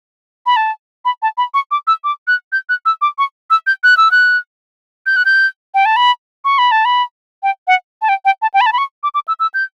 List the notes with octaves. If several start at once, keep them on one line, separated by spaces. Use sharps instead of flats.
B5
A5
B5
A5
B5
C#6
D6
E6
D6
F#6
G6
F#6
E6
D6
C#6
E6
G6
F#6
E6
F#6
G6
F#6
G6
G5
A5
B5
C#6
B5
A5
B5
G5
F#5
A5
G5
G5
A5
G5
B5
A5
B5
C#6
D6
D6
E6
E6
G6